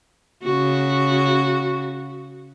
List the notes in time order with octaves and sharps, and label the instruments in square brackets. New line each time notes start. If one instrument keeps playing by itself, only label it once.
[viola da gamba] C#3 F#4